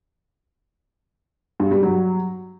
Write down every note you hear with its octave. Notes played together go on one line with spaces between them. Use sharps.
G2
G3
F#3